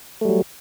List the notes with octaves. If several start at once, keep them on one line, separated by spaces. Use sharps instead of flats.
F#3 G3 A3